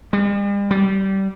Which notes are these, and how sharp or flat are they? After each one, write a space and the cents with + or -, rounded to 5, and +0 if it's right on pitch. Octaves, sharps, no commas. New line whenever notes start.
G3 +45
G3 -20